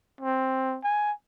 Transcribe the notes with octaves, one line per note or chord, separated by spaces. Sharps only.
C4
G#5